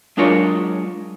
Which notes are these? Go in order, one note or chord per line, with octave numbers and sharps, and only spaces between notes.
F#3 G#3 D4 F4 A#4 C#5